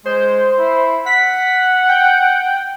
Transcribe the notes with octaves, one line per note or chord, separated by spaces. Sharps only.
G#3 C5
E4
F#5 B6
G5